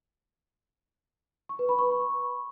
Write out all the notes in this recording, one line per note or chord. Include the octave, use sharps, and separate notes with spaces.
C#6
B4
B5
C#6